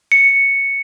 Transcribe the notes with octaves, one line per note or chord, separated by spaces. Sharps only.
C#7